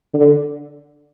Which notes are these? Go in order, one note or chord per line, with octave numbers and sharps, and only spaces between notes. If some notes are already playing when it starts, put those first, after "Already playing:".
D3